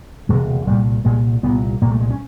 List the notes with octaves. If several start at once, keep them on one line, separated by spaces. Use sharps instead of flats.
E1 D2 C3 G#3
C2 A#2 G3
C2 A#2 G#3
C2 A#2 B3
C2 A#2 A#3
A3
G#3
C#4